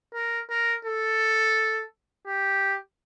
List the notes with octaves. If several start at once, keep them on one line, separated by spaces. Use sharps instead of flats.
A#4
A#4
A4
G4